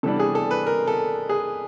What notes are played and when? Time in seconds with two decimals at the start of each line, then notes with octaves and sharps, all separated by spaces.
0.03 C3 E3 G3 B3 D4 A4
0.20 G#4
0.35 A4
0.51 B4
0.67 A#4
0.87 A4
1.29 G#4